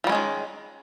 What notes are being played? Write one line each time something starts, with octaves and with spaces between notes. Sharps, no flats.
D#3 F3 G3 G#3 C#4